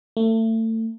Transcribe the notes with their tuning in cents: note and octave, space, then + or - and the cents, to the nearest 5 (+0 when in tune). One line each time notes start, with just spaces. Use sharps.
A3 +30